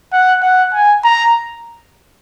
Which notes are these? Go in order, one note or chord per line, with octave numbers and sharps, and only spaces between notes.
F#5
F#5
G#5
A#5